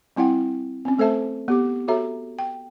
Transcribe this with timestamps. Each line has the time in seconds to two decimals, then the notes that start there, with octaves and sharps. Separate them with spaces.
0.16 G3 C4 E4 F#5 G5
0.85 C4 C#4
0.98 A3 A4 C5 E5 A5
1.48 B3 G4 D6
1.88 F#4 A4 C#5 E5 A#5
2.39 G5